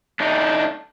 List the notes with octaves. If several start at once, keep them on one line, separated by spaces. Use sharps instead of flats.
A3 D4 D#4